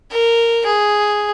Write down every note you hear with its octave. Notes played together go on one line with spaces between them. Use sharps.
A#4
G#4